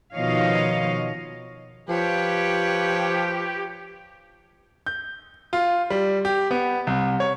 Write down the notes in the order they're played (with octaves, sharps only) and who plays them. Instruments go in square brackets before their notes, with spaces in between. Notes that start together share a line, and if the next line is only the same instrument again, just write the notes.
[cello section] B2 D#3 F3 C#5 D#5 F5
[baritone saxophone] F3 [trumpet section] G4 [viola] B4 C#5
[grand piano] G6
F4
G3
G4
B3
C2
C#5